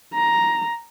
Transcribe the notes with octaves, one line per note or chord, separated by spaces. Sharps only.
A#5